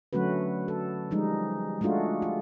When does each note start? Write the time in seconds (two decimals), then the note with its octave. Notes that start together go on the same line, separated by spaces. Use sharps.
0.13 D3 F#3 A3 C#4 F#4 B4
0.68 A4
1.11 F3 G3 G#3 D#4
1.81 G#3 A3 D4 F4 F#4
2.22 F4